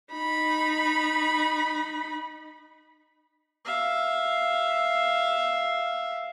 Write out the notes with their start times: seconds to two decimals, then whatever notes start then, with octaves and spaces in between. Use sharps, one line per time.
0.13 D#4 B5
3.65 E5 F5